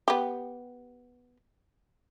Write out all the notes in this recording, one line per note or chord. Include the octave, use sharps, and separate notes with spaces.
B3 G4